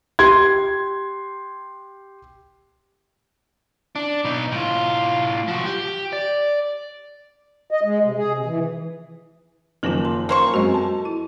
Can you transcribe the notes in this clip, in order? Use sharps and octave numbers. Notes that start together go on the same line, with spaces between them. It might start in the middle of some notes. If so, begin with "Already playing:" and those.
G4 C6 G#6
D4
B2 D#4
A2 F4
F3 F#4
G4
D5
D#5
G#3
C3
G#4
C3
E3
F#1 D#3 F3 A#3 F4 F#7
C6
A#3 C5 C#6
F#2 G#3 C4 F#4 D#5
F#4 A4 A5
E4